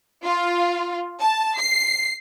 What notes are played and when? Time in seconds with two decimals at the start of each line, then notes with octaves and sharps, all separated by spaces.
0.23 F4
1.21 A5
1.58 C7